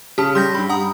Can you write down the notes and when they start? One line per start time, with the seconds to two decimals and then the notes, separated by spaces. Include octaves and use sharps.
0.18 C#3 G4 A5
0.35 G3 C6 G6 A#6
0.54 G2 G3 B5
0.69 F#5 A#5 D#6